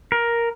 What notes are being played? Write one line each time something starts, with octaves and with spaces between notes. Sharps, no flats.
A#4